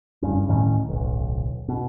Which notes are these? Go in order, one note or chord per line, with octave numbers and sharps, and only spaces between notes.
F#1 G2 C#4
D1 A2 D#3 C#4
D1 B1
B2